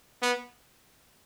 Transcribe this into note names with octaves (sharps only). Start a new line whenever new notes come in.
B3